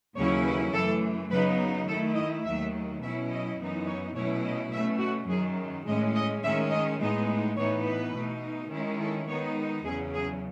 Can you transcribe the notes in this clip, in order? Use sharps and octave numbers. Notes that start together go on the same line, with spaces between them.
D#2 C#3 F#3 C#4 E4 C#5
B4
F#2 E3 A3 A4
C#3 F#3 B3 D#4 B4
D#3 A3 E4 A4
D#5
D#2 D#3 F#3 A3 E5
B2 F#3 C#4 E4 E5
D#5
F#2 E3 B3 D#4
C#5
B2 F#3 A3 C#4 E4 C#5
D#5
B2 A3 C#4 E5
F#4
F#2 D#3 F#3 G#4
A2 G#3 C#4 D#5
D#5
D#3 G#3 C#4 E5
D#5
A2 G#3 B3 D#4 D#5
A2 E3 B3 D#4 C#5
B4
B2 A3 D#4
D#3 G#3 C#4 E4
A4
D#3 G#3 B3 D#4 C#5
E2 C#3 F#3 C#4 G#4
G#4